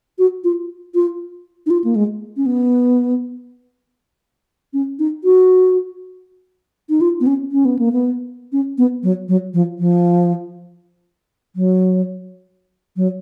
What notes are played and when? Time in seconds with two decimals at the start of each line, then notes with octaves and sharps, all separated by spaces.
0.19 F#4
0.44 F4
0.95 F4
1.66 D#4
1.70 F4
1.84 A#3
1.96 G#3
2.37 C#4
2.46 B3
4.73 C#4
4.99 D#4
5.24 F#4
6.90 D#4
7.01 F4
7.20 B3
7.27 C#4
7.52 C#4
7.65 B3
7.79 A#3
7.92 B3
8.52 C#4
8.78 B3
9.03 F#3
9.29 F#3
9.54 F3
9.79 F3
11.56 F#3
12.97 F#3